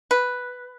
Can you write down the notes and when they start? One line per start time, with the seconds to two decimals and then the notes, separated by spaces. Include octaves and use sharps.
0.11 B4